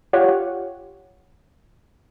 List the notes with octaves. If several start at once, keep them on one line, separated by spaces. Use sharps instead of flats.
F4 G4 C#5 F#5